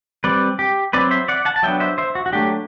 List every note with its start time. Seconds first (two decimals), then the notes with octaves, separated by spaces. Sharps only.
0.24 G3 C4 B4 D5
0.59 G4
0.93 F#3 C4 B4 D5
1.11 C5 E5
1.28 D5 F#5
1.45 F#5 A5
1.56 A5
1.63 F#3 B3 D4 E5 G5
1.80 C5 E5
1.98 C5 E5
2.15 F#4
2.26 F#4
2.32 F#3 A3 D4 G4